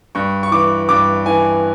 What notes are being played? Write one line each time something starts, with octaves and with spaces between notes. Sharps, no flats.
G2 C#6
C#6
E3 D6
G2 D6
E3 G#5